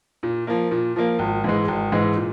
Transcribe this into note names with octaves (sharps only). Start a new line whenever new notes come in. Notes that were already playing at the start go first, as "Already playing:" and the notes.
A#2
F3 A#3
A#2
F3 A#3
G#1
G#2 E3 G#3
G#1
G#2 E3 G#3
A#2